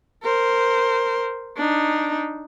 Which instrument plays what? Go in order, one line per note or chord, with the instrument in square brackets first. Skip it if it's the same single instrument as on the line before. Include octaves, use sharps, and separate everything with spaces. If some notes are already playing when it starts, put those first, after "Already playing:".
[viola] A#4 C5
D4 D#4